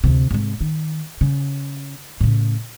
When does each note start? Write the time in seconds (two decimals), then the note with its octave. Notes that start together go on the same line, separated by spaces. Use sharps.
0.04 D2 C3
0.31 G#2 C3
0.61 D#3
1.21 C#3
2.21 A2 C#3